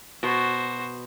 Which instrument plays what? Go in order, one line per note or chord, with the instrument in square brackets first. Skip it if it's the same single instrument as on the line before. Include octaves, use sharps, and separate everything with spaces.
[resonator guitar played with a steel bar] B2 [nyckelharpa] F#4 C5